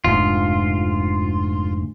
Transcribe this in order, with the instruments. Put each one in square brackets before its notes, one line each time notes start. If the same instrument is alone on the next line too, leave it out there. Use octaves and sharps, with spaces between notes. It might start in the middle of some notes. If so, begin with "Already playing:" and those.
[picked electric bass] F1 D2 G#2 [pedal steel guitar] F4